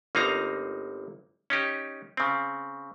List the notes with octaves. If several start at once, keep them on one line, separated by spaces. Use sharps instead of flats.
G1 A#3 C4 D#4 F5 A#5
C#4 D#4 G4
C#3 C4